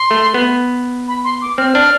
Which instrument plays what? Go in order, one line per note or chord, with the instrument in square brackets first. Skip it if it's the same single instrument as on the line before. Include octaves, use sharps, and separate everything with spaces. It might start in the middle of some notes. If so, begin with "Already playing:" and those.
Already playing: [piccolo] C6
[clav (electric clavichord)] A3
B3
[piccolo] B5
C6
D6
[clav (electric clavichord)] C4 [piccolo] F6
[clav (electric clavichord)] D4 [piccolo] F6